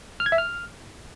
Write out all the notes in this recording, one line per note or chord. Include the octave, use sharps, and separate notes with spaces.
F6
G#6
E5
F6